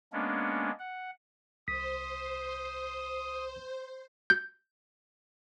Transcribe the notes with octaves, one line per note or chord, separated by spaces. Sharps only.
G#3 A#3 B3 C#4 D4
F#5
C2 C5 D#6 B6
G6